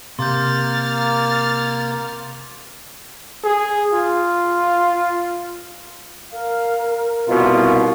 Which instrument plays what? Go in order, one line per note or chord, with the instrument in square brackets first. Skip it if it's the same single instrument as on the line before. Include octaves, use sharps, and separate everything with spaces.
[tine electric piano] C3 [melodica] A#3 [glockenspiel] C6 G6 [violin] F6 A6
[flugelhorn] G#4
F4
[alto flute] A#4 [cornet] F5
[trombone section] C2 B2 [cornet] F4 [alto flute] A#4